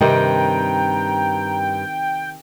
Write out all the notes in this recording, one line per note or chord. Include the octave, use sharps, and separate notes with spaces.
G2 C3 D#3 G5 A#5